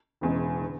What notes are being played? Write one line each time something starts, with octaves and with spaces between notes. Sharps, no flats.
E1 E2 C#3 G#3
D3